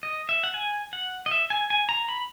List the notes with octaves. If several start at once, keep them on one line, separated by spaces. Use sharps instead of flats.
D#5
E5
F#5
G#5
F#5
D#5
E5
G#5
G#5
A#5
B5